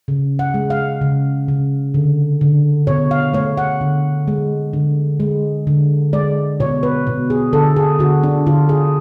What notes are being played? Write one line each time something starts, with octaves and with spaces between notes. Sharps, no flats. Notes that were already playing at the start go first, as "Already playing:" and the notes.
C#3
F#5
G#3
F5
C#3
C#3
D3
D3
B2 C#5
F5
A3 C#5
F#5
D3
G#3
D3
G#3
D3
G#3 D5
B2 C#5
B4
B2
G#4
D3 A4
G#4
D3 F#4
D4
D3 F4
G#4